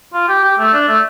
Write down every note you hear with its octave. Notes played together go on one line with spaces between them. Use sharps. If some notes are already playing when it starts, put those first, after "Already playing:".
F4
G4
G4
A3
D4
A3